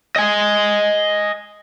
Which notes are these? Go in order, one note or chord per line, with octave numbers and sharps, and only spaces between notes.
D#5 G#5